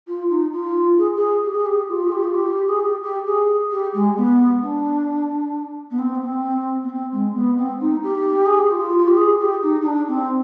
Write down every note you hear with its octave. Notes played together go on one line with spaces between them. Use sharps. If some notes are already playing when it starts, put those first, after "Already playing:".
F4
D#4
F4
G#4
G#4
G4
G#4
G4
F4
G#4
G4
F4
G4
G#4
G4
G4
G#4
G4
G#3
B3
D4
B3
C4
B3
C4
B3
C4
G#3
B3
C4
D#4
G4
G#4
G4
F4
F4
G4
G#4
G4
D#4
D#4
D4
C4